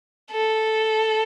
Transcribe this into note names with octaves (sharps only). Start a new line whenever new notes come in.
A4